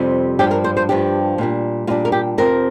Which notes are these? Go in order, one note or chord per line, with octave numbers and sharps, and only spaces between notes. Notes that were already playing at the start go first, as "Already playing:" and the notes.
Already playing: F2 C3 G3
G2 F3 D4 G4
A#4
C5
C5
G2 F3 D4 G4
A#2 G3 D4
A#2 G3 D4 F4
A#4
G4
F2 C3 F3 C4 A#4